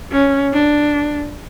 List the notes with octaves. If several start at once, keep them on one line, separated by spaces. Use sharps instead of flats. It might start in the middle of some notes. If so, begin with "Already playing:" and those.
C#4
D4